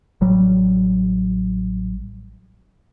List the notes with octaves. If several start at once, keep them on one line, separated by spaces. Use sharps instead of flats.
A1 F#3 G3